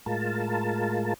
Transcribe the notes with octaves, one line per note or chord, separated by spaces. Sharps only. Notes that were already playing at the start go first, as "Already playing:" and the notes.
A2 G#3 F4 A#4 A5